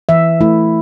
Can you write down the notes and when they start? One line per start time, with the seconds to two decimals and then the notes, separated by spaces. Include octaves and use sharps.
0.09 E3 E5
0.41 A3 E4